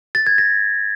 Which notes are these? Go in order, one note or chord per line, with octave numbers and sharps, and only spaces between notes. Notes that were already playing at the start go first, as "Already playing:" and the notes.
A6
G#6
A#6